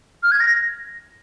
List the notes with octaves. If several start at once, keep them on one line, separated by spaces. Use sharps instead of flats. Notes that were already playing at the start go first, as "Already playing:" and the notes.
F6
G#6
A#6